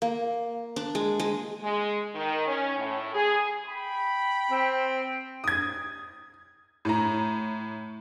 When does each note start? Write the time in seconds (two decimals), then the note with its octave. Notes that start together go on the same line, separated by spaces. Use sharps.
0.02 A#3
0.76 D4
0.95 G#3
1.20 G#3
1.63 G#3
2.15 D#3
2.47 C#4
2.77 A2
3.14 G#4
3.67 G5 B5
4.51 C4
5.44 D#6 G#6
6.85 A2 A#5